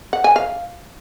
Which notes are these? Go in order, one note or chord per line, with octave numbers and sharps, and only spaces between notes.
F#5
G#5
F5